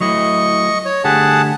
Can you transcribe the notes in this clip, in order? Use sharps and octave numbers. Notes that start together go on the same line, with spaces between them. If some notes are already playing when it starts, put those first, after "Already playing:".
F#3 A3 E4 D#5 C#6
C#5
D3 A3 G4 G#4 F#5 A5